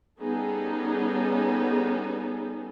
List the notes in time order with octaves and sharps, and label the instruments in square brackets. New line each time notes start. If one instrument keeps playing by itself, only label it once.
[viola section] G3 B3 C#4 D#4 G#4 A4